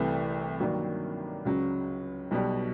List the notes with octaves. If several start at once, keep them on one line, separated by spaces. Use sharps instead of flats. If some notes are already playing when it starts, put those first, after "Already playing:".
Already playing: C2 C3 E3 A3
G2 D#3 F#3 A#3 D4
C#2 C#3 F#3
B1 B2 G3